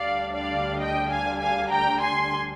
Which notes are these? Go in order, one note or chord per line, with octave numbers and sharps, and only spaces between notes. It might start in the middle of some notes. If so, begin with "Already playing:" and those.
Already playing: D2 D3 G3 D4 D5 F5
D5 F5
D#5 G5
F5 G#5
F5 G#5
G5 A#5
G#5 C6